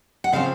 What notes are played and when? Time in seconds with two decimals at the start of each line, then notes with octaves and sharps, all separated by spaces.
0.24 F#5
0.33 C#3 F3 C4 F5